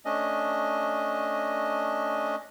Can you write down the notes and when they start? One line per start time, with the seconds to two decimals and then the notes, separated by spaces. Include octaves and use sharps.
0.05 A3 C#4 D4 D#5